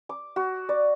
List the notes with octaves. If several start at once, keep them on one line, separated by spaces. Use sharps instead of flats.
D6
F#4
D5